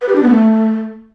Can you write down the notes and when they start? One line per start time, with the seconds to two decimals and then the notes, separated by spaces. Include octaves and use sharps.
0.02 B4
0.09 G4
0.16 D4
0.23 B3
0.30 A3